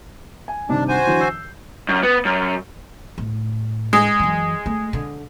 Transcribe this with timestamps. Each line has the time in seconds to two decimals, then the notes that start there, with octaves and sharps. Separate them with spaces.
0.48 G#5
0.69 G2 C3 D#3 D4
0.88 F#4 C5 G#5
1.07 D3 E3 F#3
1.20 E6 G6 C7
1.89 F#2
2.03 B3
2.25 F#2
3.18 A2
3.93 G#3
4.20 F#2 E3
4.66 A3
4.93 D3